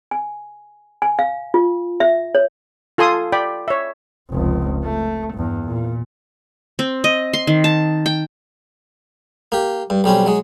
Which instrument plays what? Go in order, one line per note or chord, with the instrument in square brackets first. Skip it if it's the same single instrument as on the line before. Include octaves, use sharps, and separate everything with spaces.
[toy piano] G#5
G#5
F5
F4
E5
C#5
[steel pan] F4 A4 G#5 C6 D#6
D5 G5 B5
C#5 E5
[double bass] F1 C#2
A3
E2 G2
A#2
[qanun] C4
D#5
C6
D#3
A5
G5
[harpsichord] A#3 G4
G2
B1 G3 C4 C#4
F#3 G#3